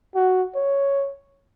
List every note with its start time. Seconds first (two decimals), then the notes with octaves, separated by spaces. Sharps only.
0.15 F#4
0.55 C#5